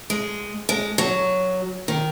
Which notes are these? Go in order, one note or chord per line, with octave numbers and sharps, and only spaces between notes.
G#3
G#3
F#3
D#3